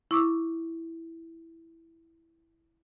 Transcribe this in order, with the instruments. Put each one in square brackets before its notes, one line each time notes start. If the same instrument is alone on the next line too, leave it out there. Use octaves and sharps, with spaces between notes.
[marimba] E4 C#6 D6 E6